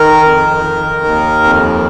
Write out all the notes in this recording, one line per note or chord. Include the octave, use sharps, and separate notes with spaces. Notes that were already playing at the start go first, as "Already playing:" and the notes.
Already playing: D#3 A#4
F2
D#3
D#2
F2